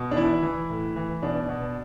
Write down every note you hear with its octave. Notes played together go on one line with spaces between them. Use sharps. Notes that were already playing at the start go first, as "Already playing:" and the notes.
Already playing: B2
D4
E3 E4
E3
A2
E3
B2 D4
B2